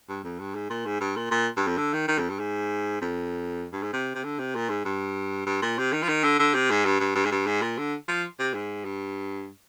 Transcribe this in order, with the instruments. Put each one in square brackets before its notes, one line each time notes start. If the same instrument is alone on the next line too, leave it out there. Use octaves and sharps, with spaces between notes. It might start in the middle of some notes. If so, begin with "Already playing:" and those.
[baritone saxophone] G2
F2
G2
G#2
A#2
G#2
G2
A#2
A#2
G2
F2
D3
D#3
D#3
F2
G2
G#2
F2
G2
G#2
C3
C3
D3
C3
A#2
G#2
G2
G2
A#2
C3
D#3
F3
D#3
D3
D3
C3
G#2
G2
G2
G2
G#2
G2
G#2
A#2
D3
F3
C3
G#2
G2